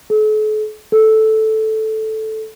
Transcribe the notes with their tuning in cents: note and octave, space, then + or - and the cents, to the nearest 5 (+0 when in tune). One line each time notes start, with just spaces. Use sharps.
A4 -45
A4 -5